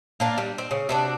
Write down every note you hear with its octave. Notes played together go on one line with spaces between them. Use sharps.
A#3 D4 F4
G3
C4
C#3
C3 D4 F#4